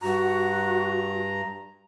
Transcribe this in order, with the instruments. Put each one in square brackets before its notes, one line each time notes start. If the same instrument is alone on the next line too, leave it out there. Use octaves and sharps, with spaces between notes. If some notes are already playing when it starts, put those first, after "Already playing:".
[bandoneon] G2 A#5 [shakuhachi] F#4